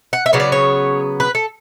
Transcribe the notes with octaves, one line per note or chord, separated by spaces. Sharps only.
F#5
E5
C#3 F#3 B3 D4
D5
C#5
B4
A4